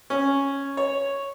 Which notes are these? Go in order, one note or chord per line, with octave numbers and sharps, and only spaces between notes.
C#4
C#5